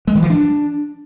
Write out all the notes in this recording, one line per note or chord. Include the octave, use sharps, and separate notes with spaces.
G#3
D#3
E3
D4